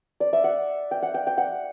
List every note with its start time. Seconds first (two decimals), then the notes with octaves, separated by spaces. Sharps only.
0.20 D5
0.33 E5
0.44 F#5
0.91 G5
1.02 F#5
1.14 G5
1.27 G5
1.38 F#5